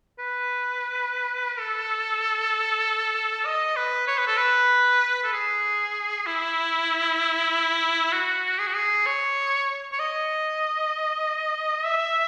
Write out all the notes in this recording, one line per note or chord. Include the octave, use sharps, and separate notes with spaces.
B4
A4
D#5
B4
C#5
B4
A4
B4
A4
G#4
E4
F#4
G#4
F#4
G#4
C#5
C#5
D#5
E5